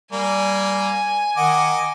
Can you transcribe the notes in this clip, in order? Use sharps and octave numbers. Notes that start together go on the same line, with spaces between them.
G3 A#3 G#5
D#3 D#5 F#5 D6